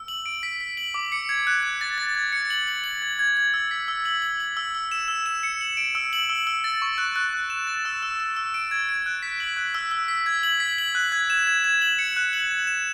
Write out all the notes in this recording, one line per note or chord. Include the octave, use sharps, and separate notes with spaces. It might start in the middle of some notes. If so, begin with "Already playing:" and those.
Already playing: E6
F#7
D7
B6
B6
F#7
D6
C#7
G#6
F#6
F#6
A6
A6
G#6
C#7
F#7
F#7
F#7
G#6
G#6
G#6
E6
B6
E6
F#7
F#7
F#7
E6
E6
E7
E6
E7
C#7
F#7
D7
E6
F#7
E6
E6
A6
C#6
F#6
F#6
F#6
E7
A6
E6
E6
E6
E6
D7
G#6
D7
F#6
B6
F#7
F#6
E6
E6
B6
G#6
F#7
B6
F#7
F#6
G#6
E7
G#6
G#6
F#7
C#7
F#6
F#7
E7
E7